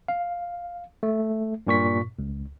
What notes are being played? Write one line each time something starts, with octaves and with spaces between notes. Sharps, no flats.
F5
A3
G2 A#2 C#6 B6
C#2